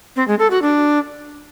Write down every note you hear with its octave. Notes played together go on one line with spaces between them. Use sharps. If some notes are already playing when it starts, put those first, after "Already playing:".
C4
G#3
A4
F#4
D4